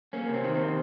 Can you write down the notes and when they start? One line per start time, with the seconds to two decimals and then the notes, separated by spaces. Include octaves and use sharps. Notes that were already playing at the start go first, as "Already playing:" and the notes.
0.13 A#3 C#4
0.29 C3
0.34 C4
0.44 D#3
0.54 C4
0.60 C3